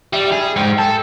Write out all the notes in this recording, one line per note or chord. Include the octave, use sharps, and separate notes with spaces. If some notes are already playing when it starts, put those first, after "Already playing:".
G3 E5
G#4
G#2 G5
A4